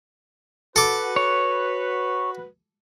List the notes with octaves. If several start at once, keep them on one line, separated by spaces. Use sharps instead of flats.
F#4 A4 B4 D6
C#5